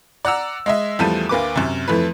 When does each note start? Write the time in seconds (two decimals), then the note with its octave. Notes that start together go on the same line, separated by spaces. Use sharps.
0.25 D5 F#5 A#5 E6
0.66 G#3 D#5 E5
0.99 E2 F3 G3 A3 A5 D#7
1.29 D2 A#3 B4 D6
1.56 F#2 C3
1.88 F2 E3 A3 B4